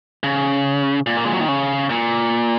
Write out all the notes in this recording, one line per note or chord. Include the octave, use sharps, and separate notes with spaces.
C#3
A#2
A#3
G#3
F#3
D#3
C#3
A#2